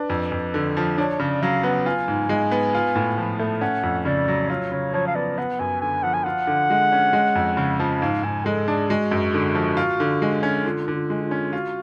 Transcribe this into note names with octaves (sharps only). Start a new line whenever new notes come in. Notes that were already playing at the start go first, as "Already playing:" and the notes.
Already playing: D4 B4
F2
F2
D3
F3
D4 C#5
C#3 D5
F#3 F5
B3 F#5
F4 G#5
G#2
G#3
B3
F4
A2
F3
A3
C#4 F#5
F2
C#3 D5
F#3
F4 C#5
C#3 C#5
F3 C#5
F5
B3 D5
B3 F#5
F#2 G#5
D3 G#5
F3 F#5
G#5
F4 F#5
D3
G#3
C#4
G#3
F2
C#3
F3
G#2 F5
G#2 G#5
G#3 A4
D4 G#4
G#3 F#4
F#2
D3
F3
F4
D3
G#3
C#4
D3 F4
D3
F4
G#3
F4
C#4
F4 F#4